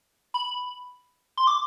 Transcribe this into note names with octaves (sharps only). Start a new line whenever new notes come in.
B5
C6
D6